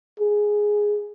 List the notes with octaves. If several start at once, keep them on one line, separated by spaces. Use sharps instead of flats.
G#4